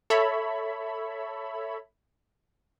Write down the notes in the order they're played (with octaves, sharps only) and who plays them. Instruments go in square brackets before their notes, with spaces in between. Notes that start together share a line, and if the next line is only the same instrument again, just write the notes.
[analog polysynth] A4 C#5 E5 B5